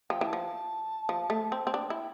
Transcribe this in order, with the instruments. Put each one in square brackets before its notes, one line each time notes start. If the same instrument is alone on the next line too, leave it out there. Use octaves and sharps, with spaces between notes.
[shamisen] F3 [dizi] G5
[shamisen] E3
[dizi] A5
[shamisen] F3
F3
A3
C4
C4
[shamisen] D4 [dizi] G5
[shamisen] E4 [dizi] G5